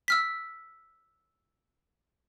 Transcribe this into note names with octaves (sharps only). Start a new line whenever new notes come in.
E6 F6 B6